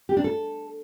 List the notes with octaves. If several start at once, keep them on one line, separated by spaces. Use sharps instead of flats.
G4
D4
A4